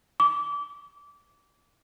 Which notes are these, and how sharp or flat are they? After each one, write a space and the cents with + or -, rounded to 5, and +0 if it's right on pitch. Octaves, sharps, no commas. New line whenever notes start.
D6 -25